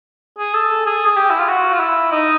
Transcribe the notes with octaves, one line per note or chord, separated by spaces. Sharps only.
G#4
A4
G#4
G#4
G4
E4
F4
F#4
F4
E4
D#4